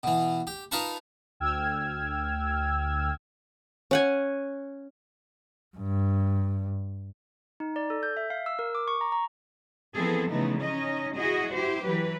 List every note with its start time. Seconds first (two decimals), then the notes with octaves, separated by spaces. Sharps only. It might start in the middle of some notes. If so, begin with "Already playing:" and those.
0.03 B2 E3
0.47 G4
0.71 D#4 F4 A#4 B4 A5 C#6
1.40 D2 G5 E6 F6 G#6
3.91 C#4 F#5 G#5
5.77 G2
7.60 D#4
7.76 D5
7.90 A4
8.03 G6
8.17 E5
8.30 F5
8.46 E6
8.59 A#4
8.75 D6
8.88 C#6
9.01 A#5
9.12 A#5
9.95 E3 F3 B3 C4 G#4 A4
10.31 C#3 E3 F3 A3 B3 D#4
10.61 C#4 D#4 D#5
11.16 E4 F#4 G#4 D#5
11.54 E4 G4 C5
11.87 E3 F#3 B4